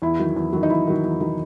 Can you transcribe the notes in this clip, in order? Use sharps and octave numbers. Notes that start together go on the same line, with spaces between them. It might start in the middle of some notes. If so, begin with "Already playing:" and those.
E2 E4
D#3 F#3
E2
D#3 F#3
D#4
E2 E4
D#3 F#3
E2
D#3 F#3